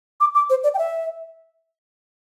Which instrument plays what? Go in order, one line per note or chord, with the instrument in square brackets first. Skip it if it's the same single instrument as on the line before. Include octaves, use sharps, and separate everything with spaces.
[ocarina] D6
D6
C5
D5
G5
E5